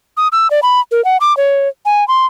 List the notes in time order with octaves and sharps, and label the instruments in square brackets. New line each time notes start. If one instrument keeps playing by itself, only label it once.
[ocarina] D#6
E6
D5
B5
A#4
F#5
D6
C#5
G#5
C6